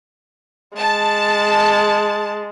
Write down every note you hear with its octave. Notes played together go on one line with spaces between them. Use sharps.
G#3 A5